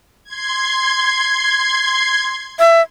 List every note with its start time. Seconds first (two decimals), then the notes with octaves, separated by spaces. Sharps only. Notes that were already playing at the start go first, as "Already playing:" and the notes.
0.24 C6 G#6
2.59 E5